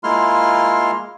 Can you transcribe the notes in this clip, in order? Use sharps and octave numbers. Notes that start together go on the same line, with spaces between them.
G#3 A#3 E4 F4 C6 F6